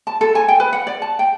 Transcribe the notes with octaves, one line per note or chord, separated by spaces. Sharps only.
A5
A4
G#5
G5
B4
F#5
D5
A5
G5